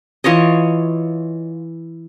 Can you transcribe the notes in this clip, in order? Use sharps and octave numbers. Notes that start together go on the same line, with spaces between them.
E3 F4 C#5 D#5